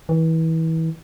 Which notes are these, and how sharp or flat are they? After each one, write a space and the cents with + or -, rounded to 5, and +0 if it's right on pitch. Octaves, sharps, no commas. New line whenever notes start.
E3 -30